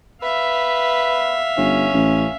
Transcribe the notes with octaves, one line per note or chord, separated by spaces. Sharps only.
B4 E5 F5
G1 C#4
A1